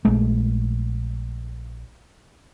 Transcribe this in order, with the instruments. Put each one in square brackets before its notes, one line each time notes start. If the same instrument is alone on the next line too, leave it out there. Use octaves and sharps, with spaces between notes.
[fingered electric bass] A#1 G#3 A3